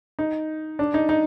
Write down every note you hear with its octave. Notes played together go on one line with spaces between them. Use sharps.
D#4
D4
D#4
D#4